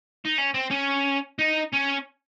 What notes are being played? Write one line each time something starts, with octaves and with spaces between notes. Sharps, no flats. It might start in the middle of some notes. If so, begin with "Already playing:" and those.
D#4
C#4
C4
C#4
D#4
C#4